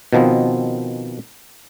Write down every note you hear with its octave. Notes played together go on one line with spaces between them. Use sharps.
B2 D#3 F3 B3 C4